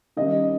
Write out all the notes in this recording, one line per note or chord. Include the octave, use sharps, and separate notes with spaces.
D#3 G3 C#4 D#5